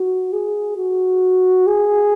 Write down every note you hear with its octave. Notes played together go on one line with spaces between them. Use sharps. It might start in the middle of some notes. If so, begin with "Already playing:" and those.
Already playing: F#4
G#4
F#4
G#4